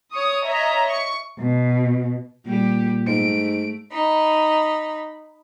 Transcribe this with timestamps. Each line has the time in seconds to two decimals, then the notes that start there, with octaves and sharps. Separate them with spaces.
0.13 C#5 C#6 D#6
0.46 C#5 D#5 E5 A#5
0.89 C#6
1.39 B2
2.46 A#2 G3 G4
3.07 G#2 A3 D7
3.92 D#4 B5